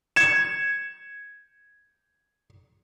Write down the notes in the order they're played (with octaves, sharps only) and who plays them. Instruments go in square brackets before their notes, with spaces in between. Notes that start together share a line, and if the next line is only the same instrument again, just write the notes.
[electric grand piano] G#6 C#7 E7